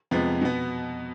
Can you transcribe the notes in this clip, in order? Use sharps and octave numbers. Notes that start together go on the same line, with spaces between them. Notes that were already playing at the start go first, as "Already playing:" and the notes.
F2 C3 F3 G#3 B3
B2 B3